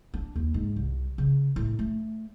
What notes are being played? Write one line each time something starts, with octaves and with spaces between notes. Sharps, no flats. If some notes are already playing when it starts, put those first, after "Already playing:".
D4
D#2
G#2
C2
C#3
A2
A3